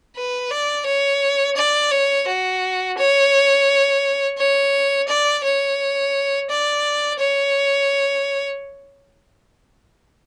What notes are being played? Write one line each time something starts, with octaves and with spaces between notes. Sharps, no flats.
B4
D5
C#5
D5
C#5
F#4
C#5
C#5
D5
C#5
D5
C#5